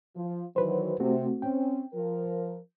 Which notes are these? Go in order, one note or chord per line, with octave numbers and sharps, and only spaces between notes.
F3
D#3 E3 F#3 B4 C5
C3 A3 C4 F#4
C4 C#4 G5
F3 A#4